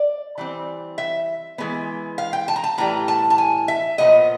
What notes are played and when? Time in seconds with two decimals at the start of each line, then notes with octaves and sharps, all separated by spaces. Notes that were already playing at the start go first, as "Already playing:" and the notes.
Already playing: D5
0.38 E3 G3 C4
0.98 E5
1.58 E3 G#3 B3
2.18 F5
2.33 G5
2.48 A5
2.56 A#5
2.64 A5
2.78 A2 E3 G3 A#5
3.08 A5
3.30 A5
3.38 G#5
3.68 E5
3.98 A#2 F3 G#3 B3 D#5